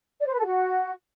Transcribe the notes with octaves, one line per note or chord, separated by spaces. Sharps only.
D5
C5
B4
A4
F#4